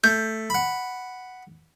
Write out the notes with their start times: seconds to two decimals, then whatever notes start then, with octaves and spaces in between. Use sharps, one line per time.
0.04 A3 G6
0.50 F#5 B5